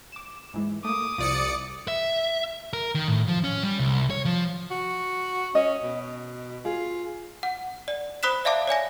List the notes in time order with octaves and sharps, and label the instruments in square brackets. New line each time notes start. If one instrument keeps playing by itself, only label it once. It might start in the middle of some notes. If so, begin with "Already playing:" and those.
[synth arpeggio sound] D6 E7
G#2 E3 G#3
[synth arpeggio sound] A3 A#3 [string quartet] D6 D#6
[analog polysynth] C2 D5 C#7 [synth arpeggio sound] F3
[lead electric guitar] E5
A#4
D#3
A2
F3
C#4
G3
C2
C#5
F3
[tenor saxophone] F#4
[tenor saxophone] C#4 [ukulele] D#5
[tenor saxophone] B2
[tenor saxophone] F4 [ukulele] G#4
[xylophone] F#5
D5
C5 B5 D#6 F#6 B6 E7
D5 E5 F5 A5 D6
C#5 D5 G#5 A#6